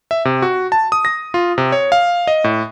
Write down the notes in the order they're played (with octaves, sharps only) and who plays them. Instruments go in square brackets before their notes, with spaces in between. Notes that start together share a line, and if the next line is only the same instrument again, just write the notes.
[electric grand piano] E5
C3
F#4
A5
D#6
A#6
F4
C3
C#5
F5
D#5
A2